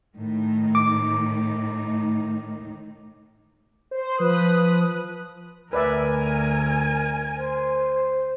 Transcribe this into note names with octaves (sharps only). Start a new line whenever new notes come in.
A2 D#3 D#4
D6
C5
F3 B4 D#6 F#6
D2 A#4 B4 D5 E5 G#5
C5